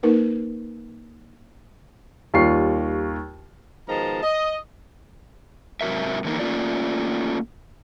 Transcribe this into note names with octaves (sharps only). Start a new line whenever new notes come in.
A#3 D#4 A#4 B4
D#2 G3 F4 C#6 C7
B2 D#3 F3 G#3 A5 A#5
D#5
G#2 C3 F#3 A#4 E5
D3 E3 A#3 D#4
A3 A#3 C#4 F4 G4 D5